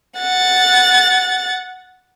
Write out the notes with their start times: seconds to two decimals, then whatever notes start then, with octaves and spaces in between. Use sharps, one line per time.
0.18 F#5 A6